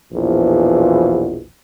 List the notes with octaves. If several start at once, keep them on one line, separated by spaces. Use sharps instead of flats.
A#1 E2 B2 E3 F3